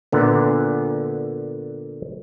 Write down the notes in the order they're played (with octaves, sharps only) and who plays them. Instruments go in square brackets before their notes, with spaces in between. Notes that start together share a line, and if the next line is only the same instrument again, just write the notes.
[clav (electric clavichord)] A#2 D3 B3